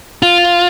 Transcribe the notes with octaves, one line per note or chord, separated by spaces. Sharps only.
F4